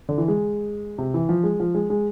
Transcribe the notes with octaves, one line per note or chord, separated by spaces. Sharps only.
D3
E3
G#3
C3
E3
F3
G#3
F3
G#3
G#3